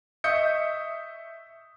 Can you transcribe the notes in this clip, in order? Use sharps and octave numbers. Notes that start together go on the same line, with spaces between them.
D#5 E5 C#6 D#6 G6 C#7